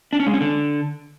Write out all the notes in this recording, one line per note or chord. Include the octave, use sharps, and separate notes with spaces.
D4
C#4
G#3
C#4
D3